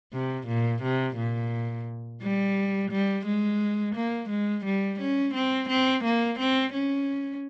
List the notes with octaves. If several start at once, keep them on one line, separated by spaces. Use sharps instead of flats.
C3
A#2
C3
A#2
G3
G3
G#3
A#3
G#3
G3
C#4
C4
C4
A#3
C4
C#4